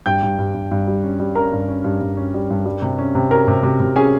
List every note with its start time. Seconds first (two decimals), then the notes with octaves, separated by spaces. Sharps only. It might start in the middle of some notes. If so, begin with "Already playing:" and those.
0.06 G2 G5 G6
0.23 G2
0.39 G2
0.54 G2
0.71 G2
0.87 G3
1.04 C#4
1.20 G3
1.35 C#4 A#4 A#5
1.52 G2
1.68 C#4
1.84 G2
2.01 G2
2.17 C#4
2.34 G3
2.50 G2
2.66 G3
2.82 C3
2.98 C#4
3.15 C3
3.31 C#4 A#4 A#5
3.48 C3
3.63 C3
3.80 C3
3.96 C#4 G#4 G#5